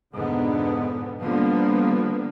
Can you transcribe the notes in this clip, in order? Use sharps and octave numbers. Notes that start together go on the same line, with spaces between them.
F2 G#2 B2 D3 B3
D3 F3 G3 A#3 B3